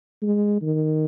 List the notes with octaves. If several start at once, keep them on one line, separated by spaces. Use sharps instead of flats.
G#3
D#3